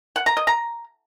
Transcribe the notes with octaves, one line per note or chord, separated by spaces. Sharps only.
F#5
A#5
D#5
A#5